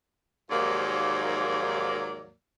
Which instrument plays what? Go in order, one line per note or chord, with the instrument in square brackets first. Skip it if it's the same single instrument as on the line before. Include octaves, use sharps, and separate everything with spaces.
[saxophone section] D#2 G#2 F3 F#3 A#3 D5